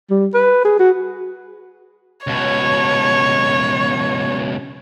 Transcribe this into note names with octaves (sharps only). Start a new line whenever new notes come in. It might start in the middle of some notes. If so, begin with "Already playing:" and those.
G3
B4
G#4
F#4
C#2 B2 C#5